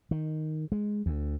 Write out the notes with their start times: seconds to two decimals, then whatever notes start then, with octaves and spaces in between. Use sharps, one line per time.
0.11 D#3
0.72 G#3
1.06 D2